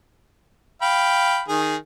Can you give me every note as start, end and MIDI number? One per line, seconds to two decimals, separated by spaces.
0.82 1.42 77
0.82 1.42 79
0.82 1.42 83
1.48 1.76 51
1.48 1.76 68